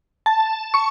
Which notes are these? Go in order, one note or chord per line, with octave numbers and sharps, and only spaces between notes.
A5
C#6